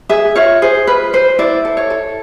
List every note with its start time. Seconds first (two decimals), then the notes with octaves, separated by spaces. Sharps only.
0.09 G#4 E5
0.36 F4 C#5
0.62 G#4 C5
0.87 F4 B4
1.13 B4 C5
1.39 E4 D5
1.65 A4
1.77 C#5
1.90 A4